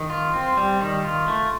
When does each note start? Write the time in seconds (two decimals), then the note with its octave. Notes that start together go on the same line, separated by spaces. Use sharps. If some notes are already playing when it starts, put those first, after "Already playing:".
Already playing: D#3
0.10 F4
0.33 C4
0.57 G3
0.81 D#3
1.04 F4
1.28 A3